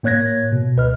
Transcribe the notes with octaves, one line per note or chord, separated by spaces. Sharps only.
A2 A#3 C#5 F#6 G#6 A#6
B2
C#2 B4 D#5 F6